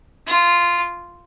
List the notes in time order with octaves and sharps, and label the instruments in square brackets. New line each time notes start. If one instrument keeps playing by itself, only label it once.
[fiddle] F4